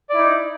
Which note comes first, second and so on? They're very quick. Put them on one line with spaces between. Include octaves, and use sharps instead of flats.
D5 E4 D#4